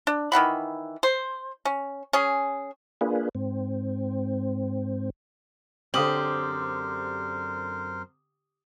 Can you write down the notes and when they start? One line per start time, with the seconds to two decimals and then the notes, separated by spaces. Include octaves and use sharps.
0.07 D4
0.32 D#3 E3 F#5 B5
1.03 C5
1.65 C#4
2.13 C#4 G#4
3.01 A#3 D4 F4 G#4 B4
3.35 G#2 C4
5.94 F#2 D3 C4 G4 A#4 C5 D#6 F#7